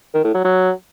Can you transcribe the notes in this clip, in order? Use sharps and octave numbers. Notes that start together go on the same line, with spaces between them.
D#3
A2
F#3
F#3